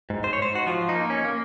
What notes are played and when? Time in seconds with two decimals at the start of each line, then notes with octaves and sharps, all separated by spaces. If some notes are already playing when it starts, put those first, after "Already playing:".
0.10 G#2
0.24 C5
0.33 C#5
0.39 G#2 C5
0.55 F#4
0.67 F3 F4
0.89 D#4
0.95 A#3
1.10 C#4
1.24 A#3